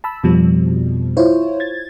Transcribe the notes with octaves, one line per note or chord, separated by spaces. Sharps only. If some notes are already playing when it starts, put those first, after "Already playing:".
A5 B5 E6
F2 B2 F3 G3
E4 F4 C5 C#5
G#6 A6